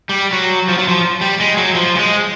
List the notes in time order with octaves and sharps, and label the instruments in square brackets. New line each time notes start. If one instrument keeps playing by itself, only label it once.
[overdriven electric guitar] G3
F#3
F3
F#3
F3
G3
G#3
F#3
F3
G3
G#3